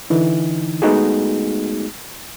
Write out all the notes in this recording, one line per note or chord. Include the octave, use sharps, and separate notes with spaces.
D3 E3 D#4
G#3 A3 B3 D#4 F#4 G#4